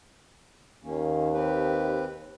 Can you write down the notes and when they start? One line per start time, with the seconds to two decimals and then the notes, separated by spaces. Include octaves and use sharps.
0.84 D#2 D#3 A#3 C#4
1.33 C4 G4 B4